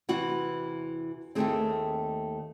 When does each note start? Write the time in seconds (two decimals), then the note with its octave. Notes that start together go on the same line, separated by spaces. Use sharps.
0.09 E2 C3 E3 F#4
1.35 D#2 D#3 A3 C4 G#4